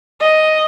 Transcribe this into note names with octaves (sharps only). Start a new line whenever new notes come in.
D#5